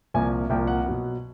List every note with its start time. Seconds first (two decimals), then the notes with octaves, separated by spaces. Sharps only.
0.14 C2 A#2 F3 A#3 G#5
0.50 C2 A#2 F3 A#3 G5
0.67 F#5
0.86 B2 F#3 B3